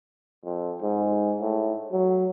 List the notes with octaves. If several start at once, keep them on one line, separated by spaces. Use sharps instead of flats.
F2
G#2
A2
F#3